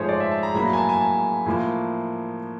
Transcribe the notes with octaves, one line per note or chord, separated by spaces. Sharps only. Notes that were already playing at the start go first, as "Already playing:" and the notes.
Already playing: G#2 F3 A3 G#4 C5 C#5
D5
E5
A5
A#5
A2 F#3 A#3 B5
A#5
G#5
A5
G#5
A5
A2 F3 A#3